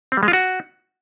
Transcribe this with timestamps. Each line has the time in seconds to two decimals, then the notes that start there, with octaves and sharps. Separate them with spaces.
0.12 C4
0.17 G3
0.23 G#3
0.28 F4
0.33 F#4